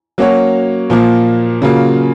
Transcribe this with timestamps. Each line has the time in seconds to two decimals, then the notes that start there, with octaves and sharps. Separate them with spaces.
0.18 F#3 A#3 C#4 F#4 C#5
0.90 A#2 F3 A#3
1.62 C#3 F#3 A#3 F4